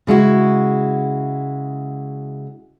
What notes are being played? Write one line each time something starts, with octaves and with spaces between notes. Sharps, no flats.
C#3 G#3 E4 F#4